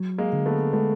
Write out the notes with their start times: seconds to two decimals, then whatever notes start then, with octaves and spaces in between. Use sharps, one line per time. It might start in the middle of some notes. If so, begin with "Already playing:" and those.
Already playing: F#3
0.18 G#3 A#3
0.33 D3
0.46 A3 B3
0.73 G#3 A3 B3